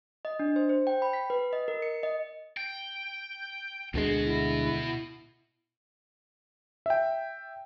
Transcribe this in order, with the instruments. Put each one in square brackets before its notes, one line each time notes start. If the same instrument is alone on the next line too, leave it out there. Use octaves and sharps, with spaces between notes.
[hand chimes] D#5
D4
C5
C5
G5
B5
B6
B4
D#5
A#4
C#7
D#5
[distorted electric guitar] G5
[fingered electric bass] D2 D3 G#3 [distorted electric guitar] B2 F#4
[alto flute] E4
[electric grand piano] E5 G5